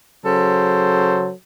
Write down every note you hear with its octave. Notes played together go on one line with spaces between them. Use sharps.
C#3 F#3 A4 C5